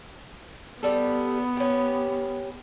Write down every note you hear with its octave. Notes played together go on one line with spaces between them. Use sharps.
G3 B3 A4
C#4 G4